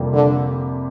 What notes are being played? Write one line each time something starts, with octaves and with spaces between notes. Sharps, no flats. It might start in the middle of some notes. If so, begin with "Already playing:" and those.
Already playing: F2 C3 G3 A#3
D3